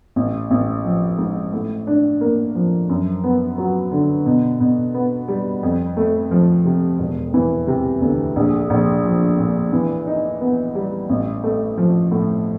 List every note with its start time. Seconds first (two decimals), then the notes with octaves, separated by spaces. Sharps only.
0.16 A1
0.51 A1
0.85 F3
1.18 G#2
1.53 A2
1.87 D4
2.21 A#3
2.55 F3
2.89 F#2
3.24 B3
3.58 F#3
3.92 D3
4.26 B2
4.60 B2
4.94 B3
5.28 G3
5.63 F2
5.97 A3
6.31 F3
6.65 C3
6.99 E1
7.34 E3
7.67 C3
8.02 D2
8.36 A#1
8.70 A#1
9.04 F3
9.38 A#2
9.73 E3
10.07 D#4
10.41 B3
10.75 G3
11.09 A1
11.44 A3
11.77 F3
12.12 A2